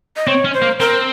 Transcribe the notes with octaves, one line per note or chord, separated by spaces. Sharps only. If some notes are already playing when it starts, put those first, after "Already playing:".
D#5
C4 C#5
C#4
C5
A#3
C4 A#4